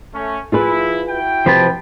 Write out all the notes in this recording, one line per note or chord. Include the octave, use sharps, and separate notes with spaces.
A3 C#4
F3 E4 F4 G#4 B4
E4 F#4 G5
C3 F3 B4 A5